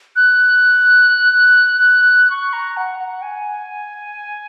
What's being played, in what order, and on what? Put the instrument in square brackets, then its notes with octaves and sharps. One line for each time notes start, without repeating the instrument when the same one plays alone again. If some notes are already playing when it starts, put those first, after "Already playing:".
[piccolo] F#6
C#6
A#5
F#5
F#5
G#5